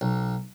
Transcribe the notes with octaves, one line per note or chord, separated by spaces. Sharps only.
B1